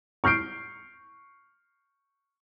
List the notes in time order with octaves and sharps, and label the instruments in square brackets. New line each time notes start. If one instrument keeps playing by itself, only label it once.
[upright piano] C#6 F6 G6 C7 D7